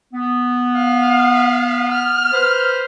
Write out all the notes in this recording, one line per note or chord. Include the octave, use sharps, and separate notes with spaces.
B3
F5
F6
B4 C5